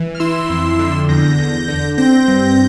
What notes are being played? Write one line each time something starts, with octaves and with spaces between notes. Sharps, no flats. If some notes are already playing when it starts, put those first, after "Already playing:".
Already playing: E3
F6
E4 C6 E6
F2
D3
E2 G6 A#6
E2
D3
C4 G6 A#6
G2